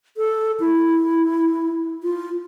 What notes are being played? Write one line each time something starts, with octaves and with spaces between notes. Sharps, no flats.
A4
E4
F4